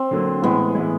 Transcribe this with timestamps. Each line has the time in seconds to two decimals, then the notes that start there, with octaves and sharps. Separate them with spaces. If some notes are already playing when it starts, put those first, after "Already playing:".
Already playing: C4
0.11 D3 F#3 A#3
0.42 A2 E3 G#3 B3
0.75 A2 E3 G#3